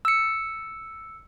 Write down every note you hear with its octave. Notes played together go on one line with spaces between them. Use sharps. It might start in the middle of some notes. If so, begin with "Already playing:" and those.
E6 C#7